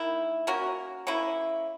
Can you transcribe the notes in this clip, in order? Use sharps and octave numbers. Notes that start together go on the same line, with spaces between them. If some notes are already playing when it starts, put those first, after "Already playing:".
Already playing: D#3 A#3 E4
A#3 C#4 F#4 A#4
A#3 C#4 E4